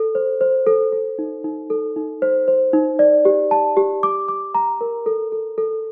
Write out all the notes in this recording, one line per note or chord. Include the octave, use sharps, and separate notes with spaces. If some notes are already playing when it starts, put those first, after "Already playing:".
Already playing: A4
C5
C5
A4
A4
D#4
D#4
A4
D#4
C5
C5
D#4
D5
G4
A5
G4
D6
D6
A#5
A#4
A4
A4
A4